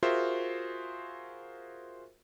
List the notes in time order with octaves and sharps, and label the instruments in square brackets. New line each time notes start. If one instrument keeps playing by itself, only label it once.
[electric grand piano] F4 F#4 G#4 A#4 C5 E5